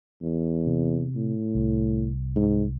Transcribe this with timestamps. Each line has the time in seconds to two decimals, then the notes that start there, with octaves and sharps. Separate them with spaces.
0.22 E2
0.67 C3
1.16 A2
1.55 C2
2.36 G#2